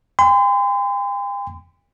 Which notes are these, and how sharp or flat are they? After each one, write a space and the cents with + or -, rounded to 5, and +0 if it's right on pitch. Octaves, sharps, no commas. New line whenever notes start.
G5 +45 C6 -40